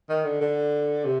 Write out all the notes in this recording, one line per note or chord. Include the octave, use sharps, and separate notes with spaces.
D#3
D3
D3
C3